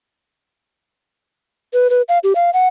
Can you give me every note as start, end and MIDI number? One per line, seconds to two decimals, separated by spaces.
1.74 1.90 71
1.90 2.02 71
2.09 2.18 77
2.24 2.33 67
2.35 2.50 77
2.54 2.68 78